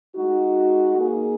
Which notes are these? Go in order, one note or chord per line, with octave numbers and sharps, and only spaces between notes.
G#3 D#4 F#4
A#3 D#4 G#4